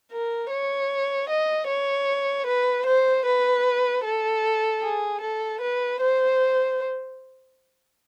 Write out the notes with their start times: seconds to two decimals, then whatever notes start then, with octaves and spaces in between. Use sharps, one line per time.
0.12 A#4
0.51 C#5
1.29 D#5
1.68 C#5
2.46 B4
2.86 C5
3.26 B4
4.04 A4
4.82 G#4
5.21 A4
5.61 B4
6.01 C5